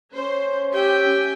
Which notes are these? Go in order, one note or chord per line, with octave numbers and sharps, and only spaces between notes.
C#4 C5
G4 E5 G5 G#5